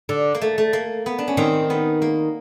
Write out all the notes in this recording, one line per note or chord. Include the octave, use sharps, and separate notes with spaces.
D3
A#3
A3
A3
A#3
B3
D4
C#4
D#3 C4
B3
A#3